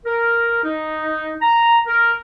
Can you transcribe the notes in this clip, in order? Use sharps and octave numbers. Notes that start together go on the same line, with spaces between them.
A#4
D#4
A#5
A#4